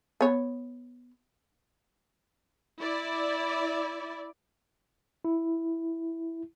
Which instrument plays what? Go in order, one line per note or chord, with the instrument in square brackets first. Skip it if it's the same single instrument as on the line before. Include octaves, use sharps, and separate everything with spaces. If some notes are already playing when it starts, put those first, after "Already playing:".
[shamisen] B3 C#5
[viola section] E4 D5
[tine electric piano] E4